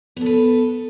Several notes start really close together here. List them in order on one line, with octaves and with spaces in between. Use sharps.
B3 A4 B4